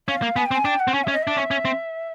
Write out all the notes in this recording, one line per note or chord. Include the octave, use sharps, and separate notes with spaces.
C#4 F5
A#3
B3 G#5
G5
C4
G#5
D4 G5
F#5
C4
C#4 G#5
C#4 E5
D#5
D4 E5
C#4
C#4
C4